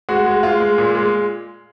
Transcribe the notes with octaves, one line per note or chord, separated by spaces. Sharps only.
G#3 F#4
G#3
G#3 F4
G#3
A#2
G#3